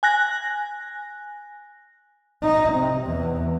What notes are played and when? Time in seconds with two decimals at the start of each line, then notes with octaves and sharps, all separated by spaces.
0.03 G#5 F#6 A#6
2.43 D#4
2.73 C3
3.06 E2